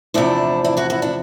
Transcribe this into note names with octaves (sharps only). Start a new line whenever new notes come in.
E2 C3 F3 A3 D4 E4
D4 E4
E4 F#4
E4 F#4
D4 E4